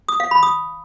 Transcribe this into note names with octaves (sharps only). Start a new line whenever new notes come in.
D#6
F5
B5
D#6